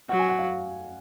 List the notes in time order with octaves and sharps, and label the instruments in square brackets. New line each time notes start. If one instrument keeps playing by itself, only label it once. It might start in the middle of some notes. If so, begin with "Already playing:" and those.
[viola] F#3 [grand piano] F#5
[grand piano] G#5
F#5
F5